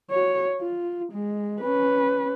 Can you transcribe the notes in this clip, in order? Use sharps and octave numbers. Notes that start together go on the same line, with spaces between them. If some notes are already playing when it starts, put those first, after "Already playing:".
F#4 C#5
F4
G#3
C#4 B4